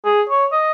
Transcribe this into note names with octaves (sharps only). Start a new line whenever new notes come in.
G#4
C#5
D#5